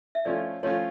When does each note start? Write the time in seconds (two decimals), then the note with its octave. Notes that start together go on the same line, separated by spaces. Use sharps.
0.15 E5
0.25 F3 A3 C#4 F4 D5
0.63 F3 A3 C#4 F4 C#5